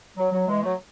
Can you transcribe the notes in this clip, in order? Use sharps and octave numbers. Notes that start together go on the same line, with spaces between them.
F#3
F#3
E3 G#3
F#3 A3